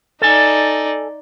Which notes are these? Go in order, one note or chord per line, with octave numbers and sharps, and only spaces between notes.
D#4 A4 D5 G#5